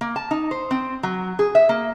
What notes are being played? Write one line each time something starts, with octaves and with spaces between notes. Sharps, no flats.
A#3
A5
D#4
C5
C4
F#3
G#4
E5
A#3